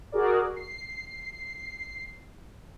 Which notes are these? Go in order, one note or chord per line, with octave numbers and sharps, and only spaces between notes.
F#4 G#4 A#4 D5
C7